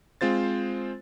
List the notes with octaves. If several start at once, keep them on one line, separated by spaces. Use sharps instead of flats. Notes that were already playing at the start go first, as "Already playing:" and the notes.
G#3 C4 F4 C5 A6